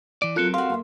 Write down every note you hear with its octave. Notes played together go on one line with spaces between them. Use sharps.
E3 D5
F#3 C4 F4 A4 A#4 F#6 C#7
F#4 G4 F5 C6
A#3 A4 E5